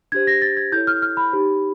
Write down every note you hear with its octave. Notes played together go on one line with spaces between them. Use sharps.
D4 G4 C5 G#6
A#6
A6
G#6
E4 A4 C#5 G6
F6
F6
B5
D#4 G4 C5